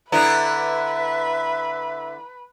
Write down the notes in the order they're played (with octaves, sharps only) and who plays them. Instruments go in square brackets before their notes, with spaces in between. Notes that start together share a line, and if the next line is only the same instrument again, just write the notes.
[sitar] D3 B3 E4 [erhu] B4 [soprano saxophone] E5 [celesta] A#5 F#6